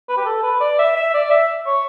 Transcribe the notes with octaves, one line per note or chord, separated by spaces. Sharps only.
B4
G4
A4
B4
D5
E5
E5
D5
E5
C#5